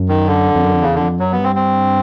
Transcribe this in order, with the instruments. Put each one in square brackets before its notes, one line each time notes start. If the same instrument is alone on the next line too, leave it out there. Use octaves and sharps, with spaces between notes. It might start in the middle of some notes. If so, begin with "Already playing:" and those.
Already playing: [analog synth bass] F#2
[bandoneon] D#3
D3
[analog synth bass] F2
F#2
F2
[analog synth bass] E2 [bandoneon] C#3
[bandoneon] D3
[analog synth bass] F2
[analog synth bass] F#2 [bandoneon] F#3
[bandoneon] B3
[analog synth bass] G2
[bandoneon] C4
C4